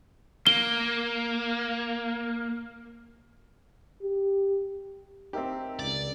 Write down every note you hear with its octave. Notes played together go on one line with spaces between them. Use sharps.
A#3 G7
G4
C4 D#4 G4 A#4 E5
C#2 D5